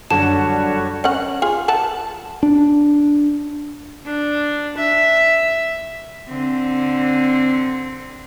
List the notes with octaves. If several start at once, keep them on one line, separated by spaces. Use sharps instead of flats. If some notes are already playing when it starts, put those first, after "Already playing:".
F#2 D3 G3 D4 F#4 C#5 A5
C#4 F#5
F4 G#4
E5 F#5 A5
D4
D4
E5
D3 C4